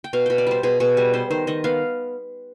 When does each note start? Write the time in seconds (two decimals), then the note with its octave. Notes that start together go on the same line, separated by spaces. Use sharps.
0.04 G5
0.13 B2 F5
0.26 B2 G5
0.38 D5
0.47 G3 C5
0.63 B2 G#4
0.80 B2 G#4
0.97 G3 G#4
1.13 B3 C5
1.30 D#3 C5
1.47 D#3 D#5
1.64 B3 F5